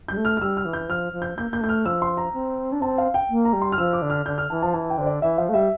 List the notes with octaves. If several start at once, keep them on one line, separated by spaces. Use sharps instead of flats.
G3 G6
A3
F6
F6
G3 E6
F6
E3
G6
F3 F6
F3
G6
A#3 G6
A#3 G6
A3 G6
F6
F3 E6
C6
A#5
C4
D4
C4 A5
F5
G5
A#3
A#5
G3
C6
F6
F3 E6
D6
D3
F6
D3 G6
F6
E3 A5
F3 A5
E3 A5
G5
D3 C5
D5
E3 E5
F3 F5
A3
G3 E5